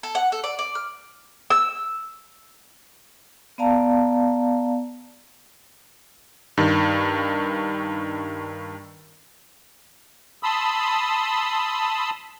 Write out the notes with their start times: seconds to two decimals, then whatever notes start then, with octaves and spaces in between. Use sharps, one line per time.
0.03 A4
0.15 F#5
0.32 A4
0.44 D5
0.59 D5
0.75 F6
1.50 E6
3.58 B3 D5 F5 A5 A#5
6.57 G2 D#3
10.43 A5 B5 C6 D#6 E6